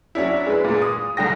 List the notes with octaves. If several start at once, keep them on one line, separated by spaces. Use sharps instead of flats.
F#3 C#4 D4 E4
G#3 B4
A#2 G#3
D#6
C2 D3 G5 A#6